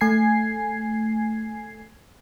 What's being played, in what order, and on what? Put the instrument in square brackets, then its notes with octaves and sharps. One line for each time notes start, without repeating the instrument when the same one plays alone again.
[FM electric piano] A3 G#5 G#6 C7